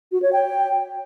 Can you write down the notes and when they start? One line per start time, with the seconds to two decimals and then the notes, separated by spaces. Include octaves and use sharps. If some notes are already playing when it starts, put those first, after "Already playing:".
0.12 F#4
0.22 C#5
0.33 G5